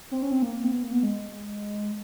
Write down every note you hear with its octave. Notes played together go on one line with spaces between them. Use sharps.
C4
C#4
C4
A#3
C4
B3
A#3
B3
G#3